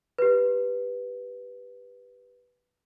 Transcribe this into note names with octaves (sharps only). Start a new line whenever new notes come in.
G4 B4